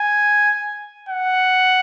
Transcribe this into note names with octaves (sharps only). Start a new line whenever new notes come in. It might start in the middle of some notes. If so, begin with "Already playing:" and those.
Already playing: G#5
F#5